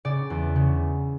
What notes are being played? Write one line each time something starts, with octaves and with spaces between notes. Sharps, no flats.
C#3 D5
E2
C#3